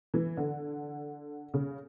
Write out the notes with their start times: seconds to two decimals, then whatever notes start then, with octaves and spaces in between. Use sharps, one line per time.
0.14 E3
0.37 D3
1.54 C#3